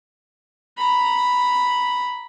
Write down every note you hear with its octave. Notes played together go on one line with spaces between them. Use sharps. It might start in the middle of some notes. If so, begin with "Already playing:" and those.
A#5 B5